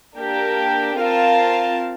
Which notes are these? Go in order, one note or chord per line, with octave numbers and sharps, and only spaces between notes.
A#3 D4 G4 A#4
C4 F4 A#4 F5 A5